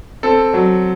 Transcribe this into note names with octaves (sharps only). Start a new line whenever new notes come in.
C4 A4
F#3